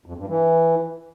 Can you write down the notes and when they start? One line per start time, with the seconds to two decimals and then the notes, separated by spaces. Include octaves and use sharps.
0.06 F2
0.17 G2
0.28 E3